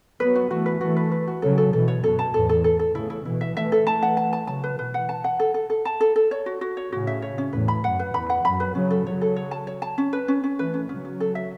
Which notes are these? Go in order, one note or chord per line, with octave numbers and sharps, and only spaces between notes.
F#3 B3 B4
F#4
E3 A3 F#4
B4
E3 A3 F#4
B4
B4
F#4
C#3 F#3 A4
A4
B2 E3 A4
C#5
F#2 B2 A4
A5
E2 A2 A4
A4
A4
A4
A2 C#3 E4
E4
B2 E3 E4
E5
E3 A3 E5
A4
E3 A3 A5
F#5
A5
A5
C#3 F#3 A5
B4
B2 E3 B4
F#5
A5
F#5
A4
A4
A4
A5
A4
A4
C#5
F#4
F#4
C#5
A2 C#3 F#4
E5
C#5
C#4
E2 A2 B4
B5
F#2 F#5
B4
E2 B5
F#5
F#2 B5
B4
C#3 F#3 C#4
A4
C#3 F#3 C#5
A4
C#5
A5
C#5
A5
C#4
B4
C#4
C#4
E3 A3 B4
C#4
C#3 F#3 C#4
C#4
A4
E5